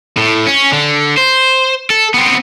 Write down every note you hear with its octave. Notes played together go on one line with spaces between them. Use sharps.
A2
C#4
D3
C5
A4
B3 C4